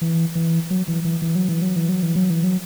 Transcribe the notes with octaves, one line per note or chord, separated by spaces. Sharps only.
E3
E3
F#3
E3
E3
E3
F#3
E3
F#3
E3
F#3
E3
F#3
E3
F#3